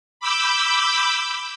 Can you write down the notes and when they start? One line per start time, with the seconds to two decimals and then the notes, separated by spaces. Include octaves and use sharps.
0.20 B5 D6 E6 G6